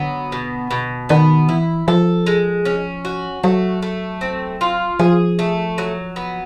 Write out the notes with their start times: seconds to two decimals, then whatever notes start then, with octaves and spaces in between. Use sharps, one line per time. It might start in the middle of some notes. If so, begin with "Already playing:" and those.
Already playing: D3 F#3 B3
0.32 B2
0.71 B2
1.09 D#3 B3
1.48 E3 E4
1.88 F3 A4
2.27 G#3
2.65 C#4
3.05 F#4
3.43 F#3 A3
3.82 A3
4.21 C4
4.61 F4
4.99 F3 G#4
5.39 A3
5.78 F#3
6.16 B3